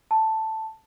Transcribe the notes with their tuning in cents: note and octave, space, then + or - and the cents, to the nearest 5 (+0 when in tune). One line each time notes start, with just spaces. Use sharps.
A5 +5